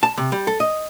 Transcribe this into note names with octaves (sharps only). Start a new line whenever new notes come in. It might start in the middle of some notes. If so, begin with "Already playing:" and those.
A5
C3
G3
A4
D#5